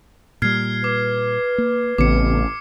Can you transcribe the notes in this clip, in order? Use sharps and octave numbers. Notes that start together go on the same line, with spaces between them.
A#2 G3 F6 G#6 C7
B4 D6
A#3
A1 C#3 B3 C4 D6 C#7